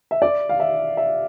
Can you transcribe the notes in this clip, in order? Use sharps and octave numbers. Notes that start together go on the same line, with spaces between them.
E5
D5
F5
E5
E5